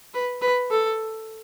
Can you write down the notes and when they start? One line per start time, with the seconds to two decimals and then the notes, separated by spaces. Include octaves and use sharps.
0.14 B4
0.42 B4
0.71 A4